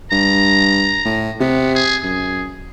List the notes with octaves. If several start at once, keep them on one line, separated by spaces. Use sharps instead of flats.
G2 A#5
A2
C3 B3
G#4
F#2 G#4